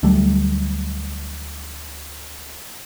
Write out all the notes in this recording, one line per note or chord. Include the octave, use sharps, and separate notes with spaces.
D2 F#3 G3 A3